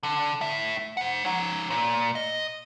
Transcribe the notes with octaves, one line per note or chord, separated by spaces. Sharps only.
D3
A2 E5
C5 F#5
D#4 C#5
A#2
D#5